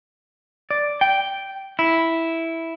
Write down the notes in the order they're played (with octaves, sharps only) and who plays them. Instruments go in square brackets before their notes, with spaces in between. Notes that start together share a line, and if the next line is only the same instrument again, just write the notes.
[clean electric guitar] D5
G5
E4